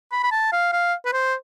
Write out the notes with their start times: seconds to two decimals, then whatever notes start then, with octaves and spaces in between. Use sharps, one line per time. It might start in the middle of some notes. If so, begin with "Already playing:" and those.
0.12 B5
0.23 B5
0.32 A5
0.52 F5
0.72 F5
1.05 B4
1.13 C5